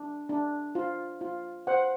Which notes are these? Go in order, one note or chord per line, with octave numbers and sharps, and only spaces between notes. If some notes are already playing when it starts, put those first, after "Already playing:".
Already playing: D4
D4
F4
F4
C5 F#5